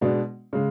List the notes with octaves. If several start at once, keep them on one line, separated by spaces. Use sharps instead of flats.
B2 G#3 B3 D4
C#3 G#3